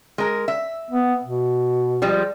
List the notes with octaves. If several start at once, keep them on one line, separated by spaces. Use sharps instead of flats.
G#3 A#4
E5
B3
B2
F3 G3 G#3